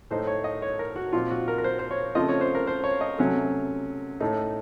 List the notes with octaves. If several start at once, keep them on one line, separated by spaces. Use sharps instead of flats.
A2 A3 D#4 C5
C#5
D#5
C#5
A#4
F#4
A#2 F3 C4 D#4 F4
F#4
A#4
A#4
C5
C5
C#5
C#3 F3 A3 C4 F4 D#5
C#5
C5
A#4
C5
C#5
D#5
C3 F#3 A3 C#4
A2 A3 D#4